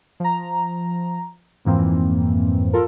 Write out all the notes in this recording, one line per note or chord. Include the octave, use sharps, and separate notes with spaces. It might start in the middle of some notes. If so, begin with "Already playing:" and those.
F3 A#5
F2 G#2 E3 A#3 C4
F4 A4 A#4